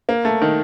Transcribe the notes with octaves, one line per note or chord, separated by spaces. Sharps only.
A#3
A3
D#3